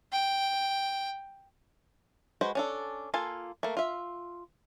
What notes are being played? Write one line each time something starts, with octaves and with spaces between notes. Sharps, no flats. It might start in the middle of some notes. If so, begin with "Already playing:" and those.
G5
G#3 F#4 B4 C5
C#4 D4 A4
A#3 F4 A4 F5 G#5
A3 A#3
F4 E5